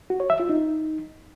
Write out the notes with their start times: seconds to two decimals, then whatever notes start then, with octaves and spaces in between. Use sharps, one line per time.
0.10 F#4
0.20 C#5
0.30 E5
0.40 F4
0.49 D#4